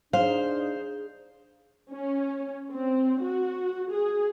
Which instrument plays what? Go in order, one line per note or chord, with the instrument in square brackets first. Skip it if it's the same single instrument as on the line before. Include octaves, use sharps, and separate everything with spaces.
[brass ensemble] D4 D#4 [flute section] G#4 [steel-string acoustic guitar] C5 [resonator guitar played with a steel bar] F5
[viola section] C#4
C4
F#4
G#4